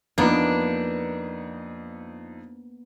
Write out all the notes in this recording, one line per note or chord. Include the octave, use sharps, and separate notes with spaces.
F2 A#3 B3 D4 D#4